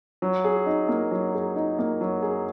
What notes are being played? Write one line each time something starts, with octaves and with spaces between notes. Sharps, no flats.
F#3
G#4
D#4
A#3
F#3
G#4
D#4
A#3
F#3
G#4